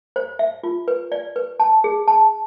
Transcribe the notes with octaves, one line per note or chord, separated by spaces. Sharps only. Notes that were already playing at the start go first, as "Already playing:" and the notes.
C5
E5
F4
B4
D5
B4
A5
G#4
A5